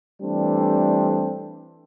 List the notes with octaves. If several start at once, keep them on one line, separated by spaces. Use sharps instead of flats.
E3 G3 A3 C4 D4